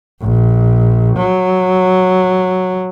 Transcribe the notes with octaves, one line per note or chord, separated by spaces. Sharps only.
A#1
F#3